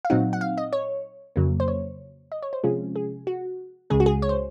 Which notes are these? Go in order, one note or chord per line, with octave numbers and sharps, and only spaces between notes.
F5
A#2 F#3 C4 D#4 F#5
F#5
F5
D#5
C#5
F2 C#3 F#3 A#3
C5
C#5
D#5
C#5
C5
C3 F3 G#3 C#4 F4 G#4
G#4
F#4
C#2 C#3 G#3 G#4
F#4
G#4
C#5
C5